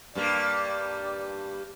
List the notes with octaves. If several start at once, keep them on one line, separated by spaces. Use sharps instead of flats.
G2 G3 A#3 D5